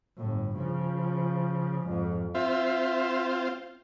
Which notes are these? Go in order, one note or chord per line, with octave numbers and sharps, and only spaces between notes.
G1 A2
C#3 F3
F2 G#2
C4 F4 E5